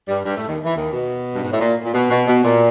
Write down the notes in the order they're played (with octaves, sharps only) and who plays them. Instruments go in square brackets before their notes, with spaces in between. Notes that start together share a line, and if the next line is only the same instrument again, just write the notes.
[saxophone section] G2 G3
G2 G3
A2 A3
D#2 D#3
E3
D#2 D#3
B2
G2
G#2
A2
A#2
A#2
B2
B2
B2
A#2